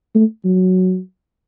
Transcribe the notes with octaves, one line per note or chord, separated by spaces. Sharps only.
A3
F#3